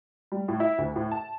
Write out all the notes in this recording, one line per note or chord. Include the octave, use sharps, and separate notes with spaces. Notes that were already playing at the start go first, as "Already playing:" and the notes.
G3
A2
E4
D2
A2
A5